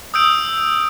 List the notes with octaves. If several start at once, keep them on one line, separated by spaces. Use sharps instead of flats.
D#6 E6 G6 D7